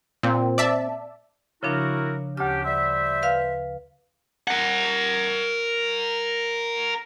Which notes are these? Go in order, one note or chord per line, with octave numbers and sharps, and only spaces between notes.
A#2 C4
D5 E5 A5
C#3 F3 D4 E4 F#4 A#4
D2 C#4 D4 G4 F6
G3 C5 E5
B4 F5 F6
A#4 F#5